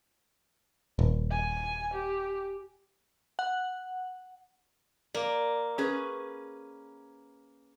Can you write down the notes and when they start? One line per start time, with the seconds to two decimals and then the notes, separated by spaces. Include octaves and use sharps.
0.99 D#1
1.31 G#5
1.94 G4
3.39 F#5
5.14 A#3 D5
5.78 C#4 G#4 B4